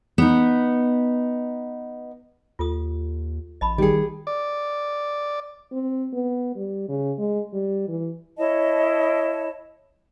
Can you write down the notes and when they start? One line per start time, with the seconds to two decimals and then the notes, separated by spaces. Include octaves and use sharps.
0.18 B3 D#4
2.59 D#2 F4 A4 D#6
3.61 A1 D#5 A5 B5
3.78 D#3 G3 G4 G#4 D#5 G5
4.27 D5
5.73 C4
6.13 B3
6.56 G3
6.89 C#3
7.18 G#3
7.53 G3
7.88 E3
8.37 E4 C#5 D#5 A5